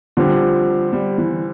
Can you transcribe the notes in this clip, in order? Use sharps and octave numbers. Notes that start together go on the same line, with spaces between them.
D3 F3 G3 C4 G4
G3
E3